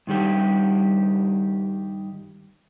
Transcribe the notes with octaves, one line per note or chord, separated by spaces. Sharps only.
G2 D#3 G3 G4